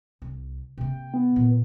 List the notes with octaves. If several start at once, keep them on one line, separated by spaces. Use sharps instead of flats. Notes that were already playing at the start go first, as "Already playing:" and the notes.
C2
C3 A#3 G5
B3
A#2